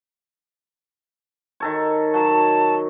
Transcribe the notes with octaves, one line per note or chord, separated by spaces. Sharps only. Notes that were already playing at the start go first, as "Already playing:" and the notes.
D#3 A4 C#5
F#3 A5